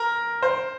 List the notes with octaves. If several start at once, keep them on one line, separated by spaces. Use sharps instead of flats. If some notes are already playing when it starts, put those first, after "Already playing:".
Already playing: A#4
C5